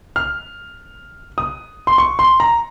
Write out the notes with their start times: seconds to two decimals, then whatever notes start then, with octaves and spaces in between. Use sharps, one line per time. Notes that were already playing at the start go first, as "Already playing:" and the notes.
0.16 F6
1.38 D#6
1.87 C6
1.98 C#6
2.19 C6
2.40 A#5